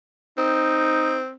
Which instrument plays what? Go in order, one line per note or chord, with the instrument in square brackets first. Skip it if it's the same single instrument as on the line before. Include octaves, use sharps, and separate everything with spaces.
[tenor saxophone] C4 [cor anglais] D#4